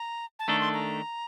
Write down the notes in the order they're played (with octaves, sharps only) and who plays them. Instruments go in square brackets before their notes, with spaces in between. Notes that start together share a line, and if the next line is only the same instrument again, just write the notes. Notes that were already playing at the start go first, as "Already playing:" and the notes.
Already playing: [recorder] A#5
A5
[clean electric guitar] D#3 A3 D4 A4 [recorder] A#5
[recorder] C6
A#5